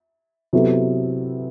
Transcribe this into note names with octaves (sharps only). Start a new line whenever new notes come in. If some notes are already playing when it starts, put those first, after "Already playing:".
C3 F#3 B3 E4 A4